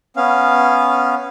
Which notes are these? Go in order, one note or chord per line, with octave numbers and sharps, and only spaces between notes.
B3 C#4 F5